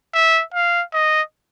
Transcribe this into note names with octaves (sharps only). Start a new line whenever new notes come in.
E5
F5
D#5